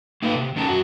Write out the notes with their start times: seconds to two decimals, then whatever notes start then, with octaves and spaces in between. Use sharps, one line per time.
0.22 A#3 D#4 B4 F5
0.35 C3
0.56 E2 D#3 C#4 A5 A#5
0.68 F#2 F#4